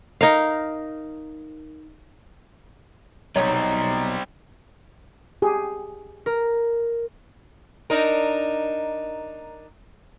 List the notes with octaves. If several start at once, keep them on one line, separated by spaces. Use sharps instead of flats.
D#4 A#4 F5
B1 G3 C4 D#4 C#5
G4 G#4
A#4
D4 D#4 A#4